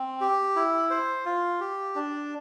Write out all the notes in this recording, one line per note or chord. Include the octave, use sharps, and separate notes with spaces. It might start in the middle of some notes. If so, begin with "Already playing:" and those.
Already playing: C4
G4
E4
C5
F4
G4
D4